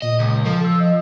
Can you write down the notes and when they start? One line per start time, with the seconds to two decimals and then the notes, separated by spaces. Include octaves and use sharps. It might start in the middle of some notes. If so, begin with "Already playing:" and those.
0.02 A#2 D#5
0.19 C#2
0.45 F3 A4
0.64 E6
0.80 D#5